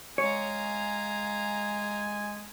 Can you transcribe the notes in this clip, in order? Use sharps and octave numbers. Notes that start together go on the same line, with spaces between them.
G#3 C#5 F5 G#5 A#5